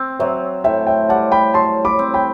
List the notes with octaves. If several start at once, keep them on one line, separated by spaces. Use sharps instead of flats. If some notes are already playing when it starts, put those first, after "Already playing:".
Already playing: C4
F#3 C5 E5
A2 E5 G5
E5 G5
G3 F#5 A5
G5 B5
F#3 A5 C6
B5 D6
C4
G5 B5